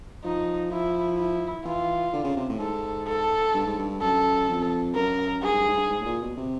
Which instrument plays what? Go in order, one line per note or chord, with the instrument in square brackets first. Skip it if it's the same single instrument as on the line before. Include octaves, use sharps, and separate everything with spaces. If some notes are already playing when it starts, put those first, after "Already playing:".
[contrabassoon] F3 [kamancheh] D#4
[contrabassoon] F3 [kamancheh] E4
[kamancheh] E4
[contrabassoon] E3 [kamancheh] F4
[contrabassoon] D3
C#3
C3
A2
[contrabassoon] G#2 [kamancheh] A4
[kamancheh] A4
[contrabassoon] G2
G#2
G2
[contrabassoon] F#2 [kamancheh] A4
[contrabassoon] F2
[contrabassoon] F#2 [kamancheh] A#4
[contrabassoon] G2 [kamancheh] G#4
[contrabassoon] G#2
G2
G#2
G2
G#2
A2
A#2
B2
C3